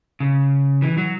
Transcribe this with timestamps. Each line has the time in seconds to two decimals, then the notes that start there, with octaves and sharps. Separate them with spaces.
0.20 C#3
0.82 E3
0.98 F#3